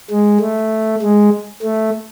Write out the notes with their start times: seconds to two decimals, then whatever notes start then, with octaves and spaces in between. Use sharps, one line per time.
0.11 G#3
0.41 A3
1.02 G#3
1.63 A3